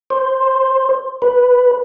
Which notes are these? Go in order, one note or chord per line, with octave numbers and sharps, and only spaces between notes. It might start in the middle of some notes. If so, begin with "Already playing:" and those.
C5
B4